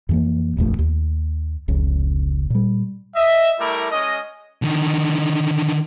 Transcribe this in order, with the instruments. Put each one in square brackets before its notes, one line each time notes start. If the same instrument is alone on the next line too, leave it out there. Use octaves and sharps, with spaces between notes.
[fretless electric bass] F2 E3 A#3
D#1 A#1 F2 A3
D#2
F1 C#2 C#3
A#2 G3
[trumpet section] D#5 E5
G3 A3 E4 A#4 D6
G#3 C#4 D#5
[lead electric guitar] D3 D#3